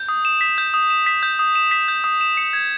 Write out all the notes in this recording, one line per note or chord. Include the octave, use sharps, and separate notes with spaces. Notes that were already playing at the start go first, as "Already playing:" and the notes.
Already playing: G6
D#6
E7
B6
G6
D#6
E7
B6
G6
D#6
E7
B6
G6
D#6
E7
C#7
G#6